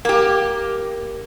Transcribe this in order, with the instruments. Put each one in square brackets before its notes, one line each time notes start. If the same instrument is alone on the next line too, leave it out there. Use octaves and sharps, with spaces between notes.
[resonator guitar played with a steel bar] A#3 G4